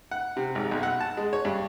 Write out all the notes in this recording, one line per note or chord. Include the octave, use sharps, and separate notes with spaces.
F#5
C3
G#1
B1
F#5
A5
G#3
C#5
G2